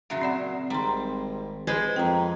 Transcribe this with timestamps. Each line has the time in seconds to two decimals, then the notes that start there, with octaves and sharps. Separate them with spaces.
0.10 A#2 C#3 F#3 E5
0.22 C4 D5 F#5
0.70 G#1 G3 A#5 C6
1.67 G#3 G#4 B4 C5
1.96 F2 G5 A#5